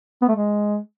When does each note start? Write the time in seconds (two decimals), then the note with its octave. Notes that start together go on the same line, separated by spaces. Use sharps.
0.22 B3
0.29 A3
0.36 G#3